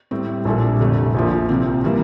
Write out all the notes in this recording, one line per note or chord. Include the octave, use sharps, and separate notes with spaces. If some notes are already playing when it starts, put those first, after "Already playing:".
A2 G3 C4
A#1 A#2 G3 D4 A4
F1 F2 D3 A3
A#1 A#2 F3
C2 C3 F3 C4
E3 G3 A#3